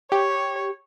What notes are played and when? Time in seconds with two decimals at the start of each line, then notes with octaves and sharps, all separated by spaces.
0.12 G4 C#5